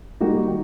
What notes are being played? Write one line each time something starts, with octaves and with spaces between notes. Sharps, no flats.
G3 A#3 D#4 F#4
D#3